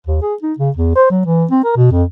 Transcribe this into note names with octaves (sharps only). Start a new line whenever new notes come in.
D#2
G#4
D#4
C#3
E2
C5
F#3
E3
C4
A#4
B2
F2